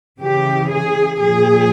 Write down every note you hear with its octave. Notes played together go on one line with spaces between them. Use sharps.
C#3 E3 G4
G#4
A#2 F3 G#4